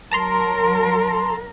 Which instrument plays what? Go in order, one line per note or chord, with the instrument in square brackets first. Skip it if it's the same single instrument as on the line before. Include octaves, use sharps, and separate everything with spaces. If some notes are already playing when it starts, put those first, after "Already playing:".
[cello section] F#3 A#4 [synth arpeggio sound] A5 A#5 C6